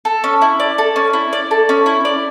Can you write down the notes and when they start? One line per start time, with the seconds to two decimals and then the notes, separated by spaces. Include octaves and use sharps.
0.05 A4
0.24 C#4
0.42 E4
0.60 D5
0.78 A4
0.96 C#4
1.13 E4
1.33 D5
1.51 A4
1.69 C#4
1.86 E4
2.05 D5